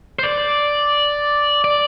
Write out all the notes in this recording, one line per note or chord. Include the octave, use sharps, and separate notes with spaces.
C5
D5
D5